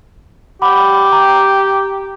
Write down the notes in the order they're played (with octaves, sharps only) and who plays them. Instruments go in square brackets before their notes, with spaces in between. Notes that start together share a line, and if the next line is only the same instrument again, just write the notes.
[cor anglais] G4 [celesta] F#5 B5 D6
[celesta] G5 A#5